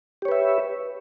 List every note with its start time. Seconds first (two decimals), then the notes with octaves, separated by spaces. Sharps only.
0.22 G4
0.25 C#5
0.28 B4
0.32 E5